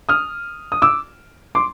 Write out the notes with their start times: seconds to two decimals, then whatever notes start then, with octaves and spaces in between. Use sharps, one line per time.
0.09 D#6 F6
0.72 D#6
0.82 D6 E6
1.55 C6 D6